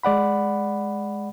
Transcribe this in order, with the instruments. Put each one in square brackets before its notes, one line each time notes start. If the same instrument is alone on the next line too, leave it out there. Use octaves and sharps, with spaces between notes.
[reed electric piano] G#3 D5 F#5 B5